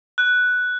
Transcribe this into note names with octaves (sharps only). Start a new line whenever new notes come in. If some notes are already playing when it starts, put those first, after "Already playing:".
F#6